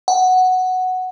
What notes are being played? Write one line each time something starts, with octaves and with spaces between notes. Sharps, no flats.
F#5